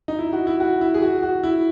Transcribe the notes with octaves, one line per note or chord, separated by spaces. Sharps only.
D#4
E4
F#4
E4
F#4
E4
G#4
F#4
F#4
E4